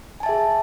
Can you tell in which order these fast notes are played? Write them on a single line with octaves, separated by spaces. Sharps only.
G#5 A5 E5 G#4